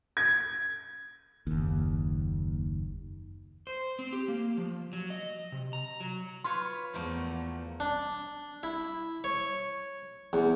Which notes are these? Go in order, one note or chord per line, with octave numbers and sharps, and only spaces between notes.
G#6
F#1 D#2
C5
C4
G4
A#3
F3
F#3
D#5
C3
A#5
F#3
F4 B4 C#5 C6
E2 F3 A3 A#3
D4
E4
C#5
E2